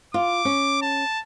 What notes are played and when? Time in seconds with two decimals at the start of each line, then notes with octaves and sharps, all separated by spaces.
0.14 F4 D6
0.45 C#4
0.82 A5